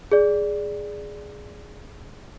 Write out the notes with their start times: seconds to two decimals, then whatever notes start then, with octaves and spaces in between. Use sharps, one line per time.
0.12 G#4 D5